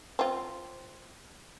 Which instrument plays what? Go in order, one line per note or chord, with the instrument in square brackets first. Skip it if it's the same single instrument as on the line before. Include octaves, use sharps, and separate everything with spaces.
[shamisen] C4 F4